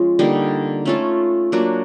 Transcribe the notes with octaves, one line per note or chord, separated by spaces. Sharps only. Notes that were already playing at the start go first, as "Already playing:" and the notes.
Already playing: F3 G#3 C#4 F4
D3 G3 A#3 D#4
A3 C#4 F4 A4
F#3 A#3 D4 F#4